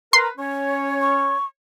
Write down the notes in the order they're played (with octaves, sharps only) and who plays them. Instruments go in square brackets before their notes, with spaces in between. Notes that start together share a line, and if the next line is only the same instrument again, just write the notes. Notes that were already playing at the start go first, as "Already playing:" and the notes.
[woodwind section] A#4 B4 A#5 [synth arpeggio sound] C6
[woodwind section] C#4 C#5
[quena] C#6